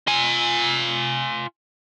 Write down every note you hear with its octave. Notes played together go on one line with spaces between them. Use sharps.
F4 G#5